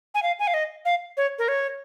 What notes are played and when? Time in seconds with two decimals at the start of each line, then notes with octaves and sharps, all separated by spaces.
0.15 G#5
0.23 F5
0.39 G#5
0.47 F5
0.54 D#5
0.85 F5
1.17 C#5
1.39 A#4
1.48 C#5